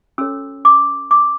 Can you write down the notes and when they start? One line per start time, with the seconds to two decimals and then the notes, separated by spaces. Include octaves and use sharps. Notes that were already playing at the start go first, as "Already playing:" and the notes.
0.18 C#4 F#4 A4 C#5 E6
0.65 D6
1.11 D6